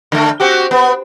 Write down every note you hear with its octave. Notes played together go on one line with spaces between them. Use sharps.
D3 A3
C4 F#4 G4
B3